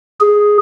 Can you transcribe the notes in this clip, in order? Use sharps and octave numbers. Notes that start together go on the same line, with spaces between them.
G#4